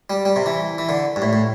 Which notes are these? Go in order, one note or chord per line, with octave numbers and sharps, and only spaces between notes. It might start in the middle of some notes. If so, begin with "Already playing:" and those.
G3
G3
C3
E3
E3
D3
G2
A2
A2